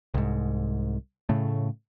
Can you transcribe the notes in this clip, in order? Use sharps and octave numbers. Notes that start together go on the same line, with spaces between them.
C2 G#2
A2 C#3 A3